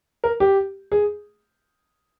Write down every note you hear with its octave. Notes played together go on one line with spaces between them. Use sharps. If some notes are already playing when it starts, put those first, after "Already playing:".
A#4
G4
G#4